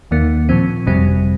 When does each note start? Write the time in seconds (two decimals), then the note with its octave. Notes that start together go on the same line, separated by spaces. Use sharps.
0.11 D#2 D#3 A#3
0.49 A#2 F3 C4
0.86 G1 F2 C3 G3 C4